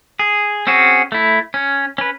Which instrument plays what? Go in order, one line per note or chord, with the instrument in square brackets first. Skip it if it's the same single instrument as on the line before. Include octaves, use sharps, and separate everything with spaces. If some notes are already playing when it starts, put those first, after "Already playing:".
[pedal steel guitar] G#4
C4 C#4 F#4 G#4
A3 E4
C#4
C#4 B4